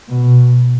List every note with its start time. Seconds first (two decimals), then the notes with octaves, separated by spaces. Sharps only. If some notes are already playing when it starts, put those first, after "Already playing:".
0.08 B2